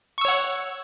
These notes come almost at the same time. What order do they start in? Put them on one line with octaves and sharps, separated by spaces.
C#6 E6 C#5 F#5